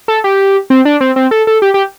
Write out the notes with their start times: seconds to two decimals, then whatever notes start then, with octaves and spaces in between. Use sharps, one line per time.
0.08 A4
0.24 G4
0.70 C4
0.85 D4
1.01 C4
1.16 C4
1.31 A4
1.47 A4
1.62 G4
1.74 G4